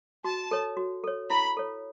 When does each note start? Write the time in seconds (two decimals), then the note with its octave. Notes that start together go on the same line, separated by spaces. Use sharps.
0.24 F#4 A5
0.51 A4 C#5
0.77 F#4
1.04 A4 C#5
1.30 E4 B5
1.57 A4 C#5